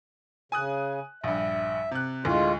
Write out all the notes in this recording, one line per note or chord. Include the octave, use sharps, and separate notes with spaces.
C#3 G#5 D#6 F#6
A#1 G2 E5
C3 F#6
D2 A2 G#3 F4